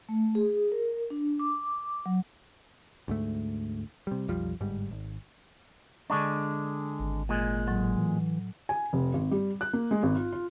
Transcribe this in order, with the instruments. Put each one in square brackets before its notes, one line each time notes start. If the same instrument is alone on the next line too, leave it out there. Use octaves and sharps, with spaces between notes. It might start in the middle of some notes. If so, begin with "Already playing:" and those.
[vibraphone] A3
G#4
A#4
D4
D6
F#3
[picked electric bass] D2 G#2 A3
C3 G3
B1 F2 F3 G3
G1 G#2 G3
G#1
[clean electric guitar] D3 G#3 D4 [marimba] C#6
[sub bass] G#1
[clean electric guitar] A#2 G#3
[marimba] A2 F#3
[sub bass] E3
[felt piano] G#5
F1
G#1
G3
F#6
A#3
G#3
G#1
F4
F4